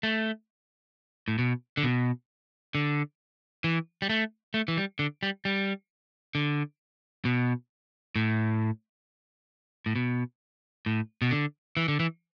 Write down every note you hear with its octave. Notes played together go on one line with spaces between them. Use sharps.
A3
A2
B2
D3
B2
D3
E3
G3
A3
A3
E3
G3
D3
G3
G3
D3
B2
A2
A2
B2
A2
B2
D3
E3
D3
E3